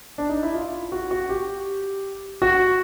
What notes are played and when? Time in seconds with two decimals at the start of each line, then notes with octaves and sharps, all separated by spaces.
0.18 D4
0.29 D#4
0.43 E4
0.54 F4
0.92 F#4
1.11 F#4
1.29 G4
2.42 F#4